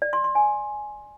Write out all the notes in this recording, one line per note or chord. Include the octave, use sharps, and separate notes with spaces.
D5
C6
C6
G#5